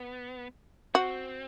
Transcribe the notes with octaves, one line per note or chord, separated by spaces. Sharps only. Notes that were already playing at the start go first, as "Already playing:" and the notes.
Already playing: B3
C4 F#4